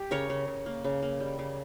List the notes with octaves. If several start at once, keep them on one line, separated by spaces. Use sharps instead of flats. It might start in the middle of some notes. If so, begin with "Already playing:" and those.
Already playing: G4
C#3 A#4 C#5
C#3
C#3
A#3
C#3
A#3
G3
C#3